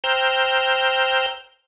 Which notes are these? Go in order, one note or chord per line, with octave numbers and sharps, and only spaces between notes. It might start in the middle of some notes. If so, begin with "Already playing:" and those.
C5 G5 A#5 E6 F6 G6